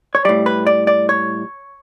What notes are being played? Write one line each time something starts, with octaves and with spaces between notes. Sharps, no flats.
C#5
A2 G3 D5
B4
D5
D5
C#5